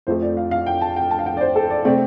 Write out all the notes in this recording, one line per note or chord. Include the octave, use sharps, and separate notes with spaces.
F2 F3 A3 C5
D5
F5
F5
G5
A5
G5
A5
F5
G5
D5
C5
A4
D5
C3 A3 C4 D5